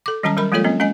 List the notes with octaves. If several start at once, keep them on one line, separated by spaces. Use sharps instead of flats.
A4 D6
D#3 F#3 G3 C#4 A5 A#5
F#3 G3 A#4 B5
F3 G#3 A#3 F4 A4 C#5
F#3 A#3 C4 C#4
G#3 C#4 D#5 G#5